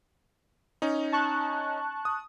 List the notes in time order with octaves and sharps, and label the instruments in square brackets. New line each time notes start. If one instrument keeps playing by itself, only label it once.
[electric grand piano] C#4 D#4
[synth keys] A5 C#6 F#6
[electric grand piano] D#6